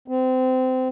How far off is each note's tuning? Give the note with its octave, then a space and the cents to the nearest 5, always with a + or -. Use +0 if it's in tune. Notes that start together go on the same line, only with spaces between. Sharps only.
C4 -25